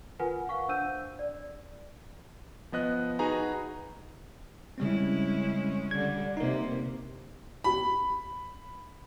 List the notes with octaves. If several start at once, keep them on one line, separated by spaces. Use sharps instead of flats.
F4 A#4 B4 F#5 G#5
F5 F#5 C#6
D4 C5 E6 G6 D#7
D5
F3 B3 D#5 F#6
D#4 F#4 G#4 B4 G#5 A#5
C#3 G3 G#3 C4 C#4 E4
D3 G3 G#6
C3 A#3 D#4 A#4
B5